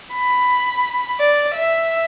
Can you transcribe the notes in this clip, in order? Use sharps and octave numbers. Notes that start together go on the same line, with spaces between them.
B5
D5
E5